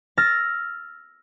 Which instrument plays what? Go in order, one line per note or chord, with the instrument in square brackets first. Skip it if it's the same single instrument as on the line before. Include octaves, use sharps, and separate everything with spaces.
[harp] E6 F6 A6 A#6